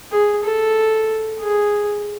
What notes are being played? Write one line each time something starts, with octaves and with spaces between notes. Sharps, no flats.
G#4
A4
G#4